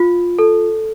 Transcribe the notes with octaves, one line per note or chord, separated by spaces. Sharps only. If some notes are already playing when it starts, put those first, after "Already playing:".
Already playing: F4
A4